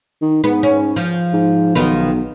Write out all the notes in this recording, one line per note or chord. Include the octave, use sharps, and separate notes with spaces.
D#3
G#2 B3
C#4
F3
G#2
B1 D#3 B3 F4